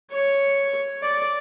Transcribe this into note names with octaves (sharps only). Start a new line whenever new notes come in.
C#5
D5